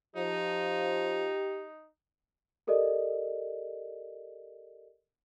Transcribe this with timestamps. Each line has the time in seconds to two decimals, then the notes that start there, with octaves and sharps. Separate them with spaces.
0.16 F3 D#4 G4
2.67 G4 A4 A#4 D5 D#5